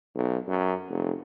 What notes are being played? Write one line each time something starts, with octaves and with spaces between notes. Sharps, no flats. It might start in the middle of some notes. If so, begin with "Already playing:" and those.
B1
F#2
F1